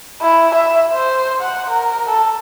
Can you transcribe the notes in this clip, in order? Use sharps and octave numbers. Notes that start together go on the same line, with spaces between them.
E4
E5
C5
F#5
A#4
A4